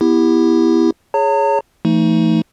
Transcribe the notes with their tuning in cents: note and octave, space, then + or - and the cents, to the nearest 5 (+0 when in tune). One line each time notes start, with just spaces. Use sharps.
B3 +0 E4 +0 G4 +20
G#4 +0 C#5 +0 A#5 -45
E3 +45 A3 +25 D#4 +20